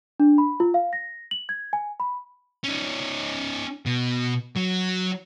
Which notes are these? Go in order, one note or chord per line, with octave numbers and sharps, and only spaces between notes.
D4
B5
F4
F5
A#6
F#7
G#6
G#5
B5
C#4 D#4
B2
F#3